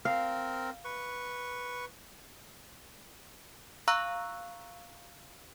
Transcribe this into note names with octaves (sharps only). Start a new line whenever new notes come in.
C4 A#4 F5
B4 C#6
F5 A#5 C#6 E6 F#6